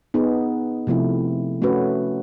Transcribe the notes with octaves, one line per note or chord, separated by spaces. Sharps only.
B3 D#4 G#4
C3 F3 A3 C4 E4
A3 C#4 F#4 B4